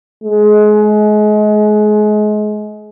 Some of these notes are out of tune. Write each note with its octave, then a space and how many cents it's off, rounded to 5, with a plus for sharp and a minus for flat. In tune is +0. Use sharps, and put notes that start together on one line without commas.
G#3 +30